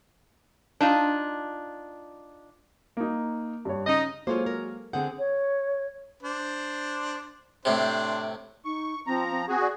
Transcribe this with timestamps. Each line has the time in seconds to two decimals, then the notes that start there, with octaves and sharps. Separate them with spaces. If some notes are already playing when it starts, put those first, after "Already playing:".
0.81 D4 D#4 F4
2.97 A#3 D#4
3.65 G2 C#5
3.87 C#3 D#4 D#5
4.27 F#3 G#3 A#3 F4 A4 C5 C#5
4.46 A#4
4.93 D3 C4 G#4 F#5 G6
5.19 C#5
6.22 D4 C5
7.65 A2 C3 D4 C5
8.65 D#4 C#6
9.07 F3 C4 A#5
9.31 C4
9.48 C4 F#4 G#4
9.61 D5